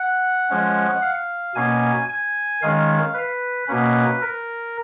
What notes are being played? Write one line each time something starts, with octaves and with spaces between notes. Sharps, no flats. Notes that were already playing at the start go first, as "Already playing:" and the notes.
Already playing: F#5
F3 G#3 C#4
F5
B2 A#3 C#4 G#5
G#5
D#3 G#3 C#4 F5
B4
B2 A#3 C#4 B4
A#4